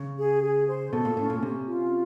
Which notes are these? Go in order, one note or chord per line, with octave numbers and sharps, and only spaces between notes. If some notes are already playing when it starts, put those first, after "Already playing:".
Already playing: C#3
G#4
G#4
C5
B2 A4
A#2
A2 C#4
A#2
C3 C#4
F4